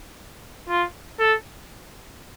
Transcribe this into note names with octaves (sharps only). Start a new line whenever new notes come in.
F4
A4